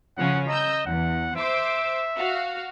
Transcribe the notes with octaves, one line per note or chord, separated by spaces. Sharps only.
C#3 F3 C#4 F#5
D#5 A#5 E6 G6
E2 F#5
C5 E5 D6 E6
F#4 F5